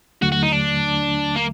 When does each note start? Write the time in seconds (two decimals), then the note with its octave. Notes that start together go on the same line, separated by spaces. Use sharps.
0.22 D#2 D3 F#3 A3 F#4
0.32 F#4
0.43 D#4
0.52 D4
1.36 A#3